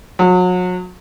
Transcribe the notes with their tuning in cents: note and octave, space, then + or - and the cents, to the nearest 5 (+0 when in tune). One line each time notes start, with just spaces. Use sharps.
F#3 -35